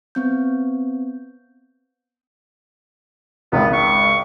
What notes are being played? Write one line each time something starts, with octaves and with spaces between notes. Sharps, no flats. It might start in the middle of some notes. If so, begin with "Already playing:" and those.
B3 C4 G6
G#1 C#2 B3
C#6